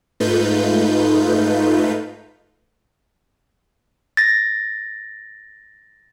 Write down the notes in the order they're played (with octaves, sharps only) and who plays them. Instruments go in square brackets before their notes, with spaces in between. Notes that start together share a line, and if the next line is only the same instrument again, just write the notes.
[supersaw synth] G#2 A3 D#4 F4 B4 G6
[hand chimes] A6 A#6